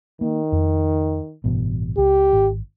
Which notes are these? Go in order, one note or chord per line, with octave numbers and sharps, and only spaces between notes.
D#3 A#3
F2
A1 G2 B2
C#2 G4
G#1